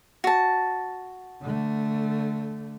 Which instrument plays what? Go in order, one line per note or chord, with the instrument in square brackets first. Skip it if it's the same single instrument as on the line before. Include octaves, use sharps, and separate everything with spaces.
[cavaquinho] F#4 A5
[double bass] D3 A3